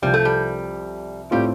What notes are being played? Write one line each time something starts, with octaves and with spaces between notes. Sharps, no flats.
C2 C3 F3 G3
A3
G3
A2 G3 A3 C4 F4